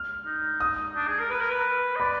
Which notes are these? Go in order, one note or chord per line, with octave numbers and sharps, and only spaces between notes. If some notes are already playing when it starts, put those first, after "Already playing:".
Already playing: F6
D#4
D#6
D4
G#4
A#4
B4
A#4
B4
D#5
D5 B5